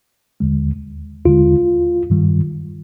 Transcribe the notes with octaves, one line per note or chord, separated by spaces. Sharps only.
D#2 D3 G#3
D#2 D3 G#3 F4
G2 D#3 G3